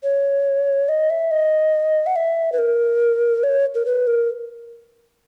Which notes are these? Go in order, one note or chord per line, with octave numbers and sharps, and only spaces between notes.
C#5
D#5
E5
D#5
F#5
E5
B4
A#4
C#5
A#4
B4
A#4